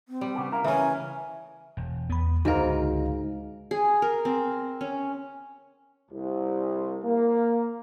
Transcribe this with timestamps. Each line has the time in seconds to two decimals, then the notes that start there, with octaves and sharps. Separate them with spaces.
0.09 C4
0.21 G3
0.35 C#3 B3 G4
0.52 E4 A#4 F5
0.64 C#3 E3 C#4 A#4 G#5
1.77 E1
2.10 E2 B3 B5
2.45 C#2 G#2 D3 F#4 A#4 D#5 F5
3.71 G#4
4.02 A#4
4.25 C4
4.81 C#4
6.11 C2
7.03 A#3